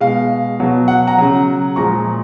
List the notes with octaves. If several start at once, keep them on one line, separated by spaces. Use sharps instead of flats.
B2 G#3 F5
B2 F#3
F#5
F#5 A#5
C#3 F#3
A#2 F3 G#3 A#5 C#6